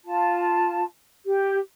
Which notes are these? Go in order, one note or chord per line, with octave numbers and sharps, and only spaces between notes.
F4 A5
G4